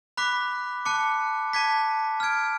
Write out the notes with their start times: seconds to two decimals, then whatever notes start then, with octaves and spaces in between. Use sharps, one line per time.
0.17 B5 D6 F#6 B6
0.85 A5 D6 F#6 C#7
1.53 A5 D6 G#6 B6
2.20 F6 G#6 D7